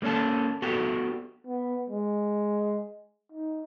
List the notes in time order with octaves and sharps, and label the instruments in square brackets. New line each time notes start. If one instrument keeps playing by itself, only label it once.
[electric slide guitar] G3 A#3 C#4 A4 A5
B3 F#4 G4 A4
[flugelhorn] B3
G#3
D#4